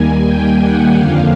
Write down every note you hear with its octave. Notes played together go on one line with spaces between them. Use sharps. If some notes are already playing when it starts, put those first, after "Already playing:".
Already playing: D#2 D#3 G3 A#3 G#5
G5
F#5
F2 D3 F3 A#3 D4 F5